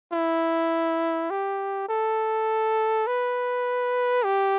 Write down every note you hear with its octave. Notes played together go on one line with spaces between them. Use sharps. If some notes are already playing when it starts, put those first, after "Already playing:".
E4
G4
A4
B4
G4